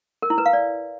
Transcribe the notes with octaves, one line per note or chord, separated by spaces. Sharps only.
A#4
E4
B4
F5
D5